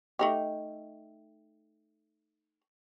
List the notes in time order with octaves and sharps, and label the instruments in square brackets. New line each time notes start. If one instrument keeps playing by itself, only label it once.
[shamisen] A3 D#4 G4